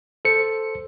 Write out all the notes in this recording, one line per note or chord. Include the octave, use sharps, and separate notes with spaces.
A4 C5 C#7